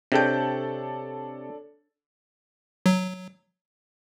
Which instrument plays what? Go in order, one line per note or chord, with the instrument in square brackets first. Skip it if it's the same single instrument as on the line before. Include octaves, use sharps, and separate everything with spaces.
[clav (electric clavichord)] C3 G5 [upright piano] D4 A4 C#5
[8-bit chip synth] F#3